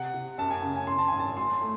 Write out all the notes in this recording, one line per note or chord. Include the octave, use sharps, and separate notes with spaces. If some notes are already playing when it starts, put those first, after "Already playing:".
Already playing: C3 F#5
C3
F#2 A5
G#5
C#3
G#5
C#3 C6
A5
G#1 G#5
A5
F#3 C6
A3